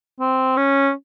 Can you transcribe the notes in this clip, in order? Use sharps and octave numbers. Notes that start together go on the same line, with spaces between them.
C4
C#4